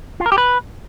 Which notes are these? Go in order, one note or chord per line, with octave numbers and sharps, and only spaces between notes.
F4
A#4
G4
B4